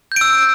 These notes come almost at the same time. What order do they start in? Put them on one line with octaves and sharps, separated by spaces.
G6 D7 E6